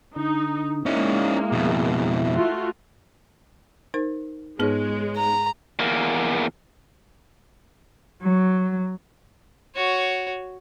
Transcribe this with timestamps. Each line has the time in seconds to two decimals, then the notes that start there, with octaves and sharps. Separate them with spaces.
0.16 D3 D#4
0.86 G#3 A#3 C#4 D#4 E4
1.52 F2 B2
2.33 A3 F4 F#4
3.94 D#4 A#4 C5
4.59 G#2 G#3 B3 D#4 G#4 C#5 F6
5.17 A#5
5.80 E2 A#3
8.21 F#3
9.75 F#4 C#5